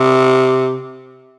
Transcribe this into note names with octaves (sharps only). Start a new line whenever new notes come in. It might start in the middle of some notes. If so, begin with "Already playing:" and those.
Already playing: C3